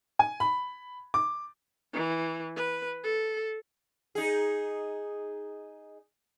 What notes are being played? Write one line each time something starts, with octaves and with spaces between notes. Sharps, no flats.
G#5
B5
D6
E3
B4
A4
D#4 G#4